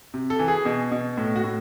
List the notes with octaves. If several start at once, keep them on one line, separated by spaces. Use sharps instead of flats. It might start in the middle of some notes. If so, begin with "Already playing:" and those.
C3
A4
E3
G#4
B2
B2
A2
F#4
A2